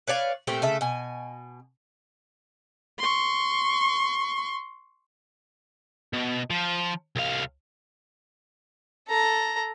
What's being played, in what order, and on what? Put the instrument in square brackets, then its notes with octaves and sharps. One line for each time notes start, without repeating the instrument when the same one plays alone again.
[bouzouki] B4 C#5 D5 F5
A#2 A3 C4 G4
C#3 A3 E5
B2 G#5
[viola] C6 C#6
[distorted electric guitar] B2
F3
C2 F5
[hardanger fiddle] A4 A#5